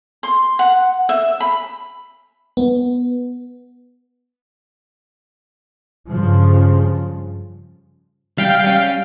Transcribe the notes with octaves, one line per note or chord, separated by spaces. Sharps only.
C6
F#5
E5
B5
B3
G2 C#3 F3
G3 F5 G5
G3 C#4